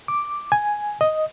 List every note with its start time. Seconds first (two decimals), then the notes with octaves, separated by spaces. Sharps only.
0.08 D6
0.52 G#5
1.01 D#5